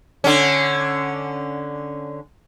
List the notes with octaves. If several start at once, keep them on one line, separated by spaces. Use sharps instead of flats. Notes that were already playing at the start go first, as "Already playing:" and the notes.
D3 C#4